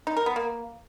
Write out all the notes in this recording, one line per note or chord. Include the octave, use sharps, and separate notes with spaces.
D#4
A#4
B3
A#3